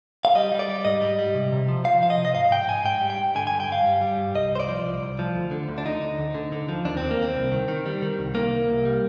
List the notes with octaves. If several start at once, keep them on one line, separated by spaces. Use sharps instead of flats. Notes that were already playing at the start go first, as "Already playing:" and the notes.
F5
G3 D#5
G3
D5
G3
G#2 D#5
G3
G3
C3
C3
F3
F3 F5
F3 F5
D#5
C3
D#5
G#2 F5
G#2 G5
G#2 G#5
G#2 G5
G3
G5
G#2
D3 G#5
G2 G#5
G5
G2 F5
G3
G3
G2
C2 D#5
C2 C5
D5
F3
C2
C2
F3
D2
D3
D2
D4
D3 D#4
D2
D2
D3
D3
F3
D#2 D4
D#2 C4
A#3
D#2 C4
C2
D#3
D#3
G3
D#3
C2
C2 A#3
C2
C2
G3